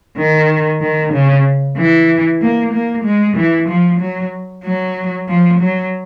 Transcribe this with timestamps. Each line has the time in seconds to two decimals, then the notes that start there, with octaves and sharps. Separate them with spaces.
0.17 D#3
0.81 D#3
1.13 C#3
1.77 E3
2.41 A#3
2.73 A#3
3.05 G#3
3.37 E3
3.68 F3
4.00 F#3
4.64 F#3
5.28 F3
5.60 F#3